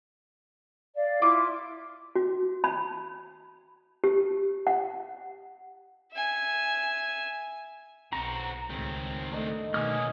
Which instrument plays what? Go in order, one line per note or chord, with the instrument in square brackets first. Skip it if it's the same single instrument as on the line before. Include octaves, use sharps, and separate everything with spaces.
[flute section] D5 F5
[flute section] E4 [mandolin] F4 D6
[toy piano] F#4
B5
G4
F#5
[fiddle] E5 G#5
[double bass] B1 [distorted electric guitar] C4 F#4 [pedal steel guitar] A#5
[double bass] C#2 A2 [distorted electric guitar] D#3 C4 [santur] G5 C#6
[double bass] A3 [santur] D4 D#4 D5
[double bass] B2 D#3 [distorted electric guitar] A#3 C#4 [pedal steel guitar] G#5 D#6 F6